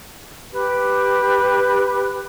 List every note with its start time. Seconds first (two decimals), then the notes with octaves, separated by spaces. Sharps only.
0.53 G4 B4